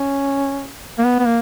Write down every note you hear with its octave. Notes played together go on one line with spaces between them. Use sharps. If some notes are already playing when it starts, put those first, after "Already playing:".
Already playing: C#4
A#3
B3
B3
A#3